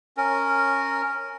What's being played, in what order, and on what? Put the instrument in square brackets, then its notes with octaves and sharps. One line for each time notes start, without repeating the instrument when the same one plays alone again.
[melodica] C#4 A#4